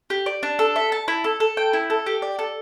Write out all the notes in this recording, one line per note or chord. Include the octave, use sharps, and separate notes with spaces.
G4
D5
D4
A4
E5
A5
E4
A4
A4
G5
E4
A4
G4
D5
A4